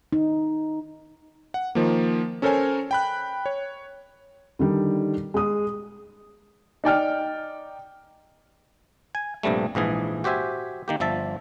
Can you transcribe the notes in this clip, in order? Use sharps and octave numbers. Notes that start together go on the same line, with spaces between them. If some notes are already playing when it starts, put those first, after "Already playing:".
D#4
F#5
D#3 F3 A#3
C#4 A4 A#4 C5 C#5 G#5
G5 B5 F#6
C#5
D3 D#3 G3
G#3 D#6
D#4 D5 G5 F6
G#5
A#1 G2 C3 G3 A3
A#1 G#2 E3 G#4
F#4 G4 C5 E5 G#5
D#3 A#3 G4
G1 F3 E5 A5